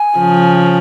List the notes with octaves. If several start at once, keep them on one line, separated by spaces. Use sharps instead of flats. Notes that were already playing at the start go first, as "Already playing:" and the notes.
Already playing: G#5
C#3 F3